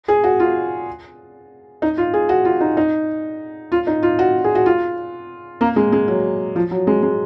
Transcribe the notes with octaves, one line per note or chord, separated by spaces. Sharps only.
G#4
F#4
F4
D#4
F4
G#4
F#4
F4
D#4
D#4
F4
D#4
F4
F#4
G#4
F#4
F4
A#3
G#3
G#3
F#3
F3
F#3
G#3
G#3